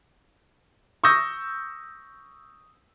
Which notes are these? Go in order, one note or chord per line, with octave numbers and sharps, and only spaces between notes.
C#6 D#6 E6 G6 A#6